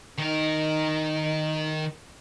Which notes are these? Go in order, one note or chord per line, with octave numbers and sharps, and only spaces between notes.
D#3 D#4 A#4